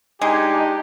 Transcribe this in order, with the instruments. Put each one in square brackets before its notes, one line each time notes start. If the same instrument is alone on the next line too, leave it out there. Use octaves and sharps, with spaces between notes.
[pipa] G#3 [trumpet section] D4 D#4 [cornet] G4 [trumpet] G#5